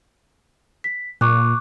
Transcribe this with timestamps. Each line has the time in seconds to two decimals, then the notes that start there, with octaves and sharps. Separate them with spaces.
0.84 B6
1.21 A#2 C#6 D6 F#6